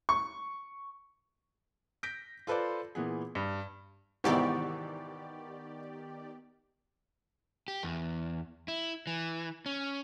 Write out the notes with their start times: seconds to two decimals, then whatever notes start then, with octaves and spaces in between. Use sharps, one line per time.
0.09 C#6
2.03 G6 A#6 B6 D7
2.47 F4 A4 B4 C5 D5
2.95 A#2 E3 B3 G#4
3.35 G2
4.24 G#2 C3 D#3 E3 B3 G4 D5 C#6
7.68 G4
7.83 E2
8.68 E4
9.07 E3
9.66 C#4